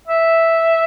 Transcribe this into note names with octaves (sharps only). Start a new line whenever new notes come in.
E5